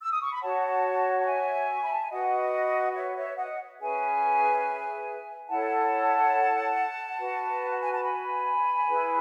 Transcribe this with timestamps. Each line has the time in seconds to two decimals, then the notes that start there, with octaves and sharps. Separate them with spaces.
0.01 E6
0.12 D#6
0.21 C#6
0.32 B5
0.41 F#4 C#5 F#5 A5
1.19 A5
1.27 E5 G#5
1.72 C#6
1.82 B5
1.92 A5
2.01 G#5
2.11 F#4 B4 D#5 F#5
2.95 C#5 E5
3.16 C#5 E5
3.37 D#5 F#5
3.80 C#4 G#4 B4 E5 G#5
5.49 E4 A4 C#5 F#5 A5
7.18 F#4 B4
7.72 F#5
7.82 G#5
7.93 A5
8.03 G#5 B5
8.87 E4 G#4 B4